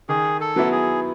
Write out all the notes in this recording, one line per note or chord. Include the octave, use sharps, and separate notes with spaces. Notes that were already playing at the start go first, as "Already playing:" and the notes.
D#3 G#4
A4
F#3 B3 E4
G#4